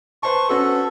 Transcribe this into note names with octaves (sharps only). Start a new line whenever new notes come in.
B4 C5 A5 C#6
C#4 F#4 A4 B4